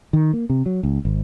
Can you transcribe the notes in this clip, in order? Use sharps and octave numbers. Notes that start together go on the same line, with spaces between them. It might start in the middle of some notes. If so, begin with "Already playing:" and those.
D#3
A#3
C3
F#3
C#2
G#1